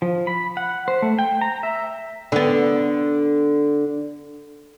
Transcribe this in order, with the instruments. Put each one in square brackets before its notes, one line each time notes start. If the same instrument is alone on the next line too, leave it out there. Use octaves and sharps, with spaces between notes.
[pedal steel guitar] F3
B5
F#5
C5
A3
G5
A#5
E5
[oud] D3 B3